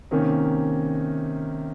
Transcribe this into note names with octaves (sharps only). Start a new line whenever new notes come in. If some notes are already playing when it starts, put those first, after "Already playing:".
C3 D#3 A#3 C#4